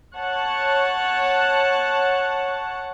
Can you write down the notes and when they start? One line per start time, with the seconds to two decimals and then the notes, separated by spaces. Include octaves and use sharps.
0.15 C#5 F#5 A5